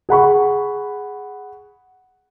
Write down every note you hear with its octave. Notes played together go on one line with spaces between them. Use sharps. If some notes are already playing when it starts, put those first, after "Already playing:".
G#4 F#5 B5 C#6